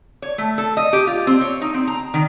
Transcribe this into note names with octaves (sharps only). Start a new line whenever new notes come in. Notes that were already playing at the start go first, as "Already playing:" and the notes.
C#5
A3
A4
D#5
G4
F4
C4
C#5
D#4
C4
A#5
D#3